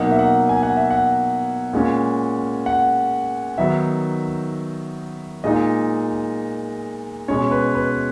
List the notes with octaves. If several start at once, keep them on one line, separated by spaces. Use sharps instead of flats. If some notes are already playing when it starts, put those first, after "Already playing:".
Already playing: B2 F#3 A#3 D#4 F#5
E5
F#5
G#5
F#5
E5
F#5
A#2 G#3 C#4
F#5
D#3 F#3 B3 D#4 E5
A#2 G#3 D#4 D#5
B2 G#3 C#4 C#5
B4
B4